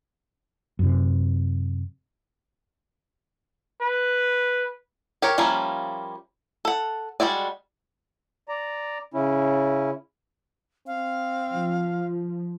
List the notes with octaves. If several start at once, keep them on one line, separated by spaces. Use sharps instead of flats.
F#2 C3
B4
G4 A#4 C#5
F3 G3 A#3 C#4 E4
A4 F#5
G3 G#3 F#4 D5
D5 A#5
C#3 C#4 E4
C4 F5
F3